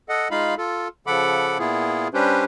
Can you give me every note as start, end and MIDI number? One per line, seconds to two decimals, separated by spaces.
0.09 0.28 69
0.09 0.28 75
0.09 0.28 78
0.31 0.55 56
0.31 0.55 63
0.31 0.55 65
0.31 0.55 77
0.31 0.55 83
0.58 0.88 65
0.58 0.88 69
1.07 1.58 49
1.07 1.58 53
1.07 1.58 69
1.07 1.58 78
1.07 1.58 83
1.07 1.58 86
1.59 2.08 46
1.59 2.08 59
1.59 2.08 64
1.59 2.08 65
1.59 2.08 68
2.14 2.44 55
2.14 2.44 61
2.14 2.44 62
2.14 2.44 67
2.14 2.44 71
2.14 2.44 72